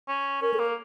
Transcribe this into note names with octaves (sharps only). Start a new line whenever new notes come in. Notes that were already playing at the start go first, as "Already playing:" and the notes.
C#4
C#4 A#4
A4
A#3 A#4